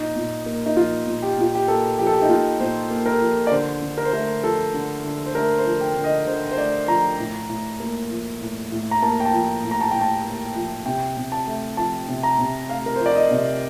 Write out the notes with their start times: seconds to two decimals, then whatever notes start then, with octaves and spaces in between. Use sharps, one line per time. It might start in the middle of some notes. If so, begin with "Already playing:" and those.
Already playing: A#2 D#4
0.16 A#2
0.46 A#3
0.66 D#4
0.76 F3 F4
1.07 A#2
1.22 G4
1.38 A#2 F4
1.55 G4
1.68 A#3 A4
1.99 F3 G4
2.07 A4
2.14 G4
2.22 D#4
2.29 A#2 F4
2.60 A#2 C5
2.91 A#3
3.06 A#4
3.21 F3
3.47 D5
3.51 D3 C5
3.83 D3
3.98 A#4
4.05 C5
4.13 A3 A#4
4.43 F3 A4
4.74 D3
5.04 D3
5.26 C5
5.35 A3 A#4
5.58 C5
5.66 F3
5.81 G5
5.97 D3
6.04 D#5
6.27 D3 C5
6.51 C5
6.58 A3 D5
6.88 F3 A#5
7.19 A2
7.49 A2
7.80 A#3
8.11 F3
8.41 A2
8.72 A2
8.91 A#5
9.02 A#3 A5
9.20 G5
9.25 A5
9.33 F3
9.64 A2
9.71 A#5
9.81 A5
9.91 A2 G5
10.01 A5
10.25 A#3
10.55 F3
10.86 C3 G5
11.17 C3
11.32 A5
11.47 A3
11.77 F3 A5
12.09 C3
12.23 A#5
12.39 C3
12.69 A3 F5
12.86 A#4
12.96 F3 C5
13.06 D5
13.15 D#5
13.31 C3